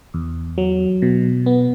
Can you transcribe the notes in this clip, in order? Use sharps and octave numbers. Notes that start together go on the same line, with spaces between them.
E2
F#3
B2
B3